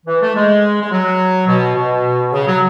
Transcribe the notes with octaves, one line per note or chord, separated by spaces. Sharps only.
E3
A3
G#3
G#3
F#3
B2
B2
C#3
F#3